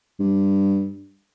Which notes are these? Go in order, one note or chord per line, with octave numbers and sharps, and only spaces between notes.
G2